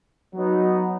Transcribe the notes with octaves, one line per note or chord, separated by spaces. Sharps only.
F#3 B3 D#4